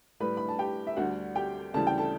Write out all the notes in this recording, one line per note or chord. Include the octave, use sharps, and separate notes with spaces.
A2 G3 B4 B5
B5
A5
G4 G5
E5
D2 D3 G3 F#4 F#5
G4 G5
D2 C#3 E3 G3 A5
G5
A4 A5